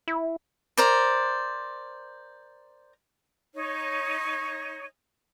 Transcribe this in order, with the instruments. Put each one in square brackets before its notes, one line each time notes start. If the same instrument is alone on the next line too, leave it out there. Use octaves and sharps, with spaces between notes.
[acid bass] E4
[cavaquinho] A#4 C5 D5
[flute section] D#4 C#5